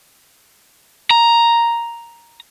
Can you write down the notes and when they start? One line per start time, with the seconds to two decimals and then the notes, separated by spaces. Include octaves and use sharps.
1.11 A#5